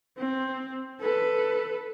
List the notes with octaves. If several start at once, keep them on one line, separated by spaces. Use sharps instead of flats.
C4
A4 B4